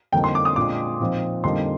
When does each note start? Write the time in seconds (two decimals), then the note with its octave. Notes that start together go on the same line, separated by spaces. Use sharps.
0.12 F2 D3 G3 A#3 D#4 G5
0.24 C6
0.35 D6
0.45 D#6
0.56 A#2 G#3 D4 D6
1.00 A#2 F3 C4 D#4
1.43 F2 D3 G3 A#3 D#4 C6